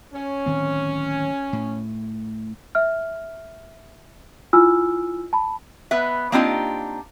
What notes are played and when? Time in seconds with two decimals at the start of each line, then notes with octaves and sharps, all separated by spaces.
0.13 C#4
0.46 D1 D#3 C4
1.53 A2
2.75 E5 F6
4.53 E4 F4 G#5 E6 F6
5.33 A5 B5
5.91 B3 B4 E5
6.32 A#3 C4 D4 D#4 F4 G4